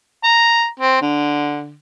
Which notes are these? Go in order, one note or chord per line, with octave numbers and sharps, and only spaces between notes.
A#5
C4
D3